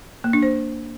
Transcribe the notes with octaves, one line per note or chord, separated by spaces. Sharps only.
A#3
D4
C5